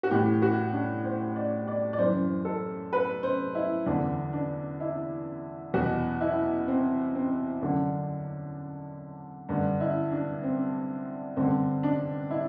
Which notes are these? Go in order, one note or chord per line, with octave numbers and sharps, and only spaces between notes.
F#4
A2 E3 G4
F#4
D4
C5
D5
D5
D5
F#2 E3 C5
A4
B4
C5
E4
E2 D3 D4
D4
E4
E2 B2 F#4
E4
C4
C4
F#2 D3 D4
G2 D3
E4
D4
C4
G2 D3 C4
D4
E4